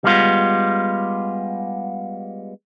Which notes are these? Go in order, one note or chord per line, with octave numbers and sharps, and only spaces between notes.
G3 G#3 B3 F4